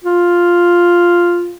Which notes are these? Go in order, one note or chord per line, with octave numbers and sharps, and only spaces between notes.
F4